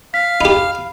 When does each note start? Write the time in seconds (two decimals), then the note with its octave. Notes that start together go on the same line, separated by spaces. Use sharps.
0.14 F5 B6
0.41 D#4 G4 B5